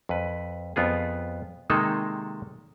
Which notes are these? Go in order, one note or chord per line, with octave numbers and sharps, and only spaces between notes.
F2 B4
F2 B3 F4 G#4
C3 D#3 G#3 A#3 D#4 A4